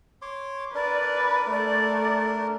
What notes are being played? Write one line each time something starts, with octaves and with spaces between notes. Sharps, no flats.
C#5 C6 D6
D4 A#4 B4 D5
A3 D5